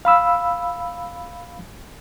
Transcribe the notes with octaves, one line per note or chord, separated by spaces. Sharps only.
F5 B5 E6